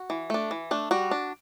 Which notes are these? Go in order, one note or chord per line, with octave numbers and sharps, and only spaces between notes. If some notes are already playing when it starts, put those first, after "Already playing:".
Already playing: F#4
E3
A3 D4
E3
A3 D4
G3 F#4
D4